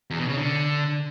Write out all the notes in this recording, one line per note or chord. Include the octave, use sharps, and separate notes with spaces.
E2
B2
C#3
D3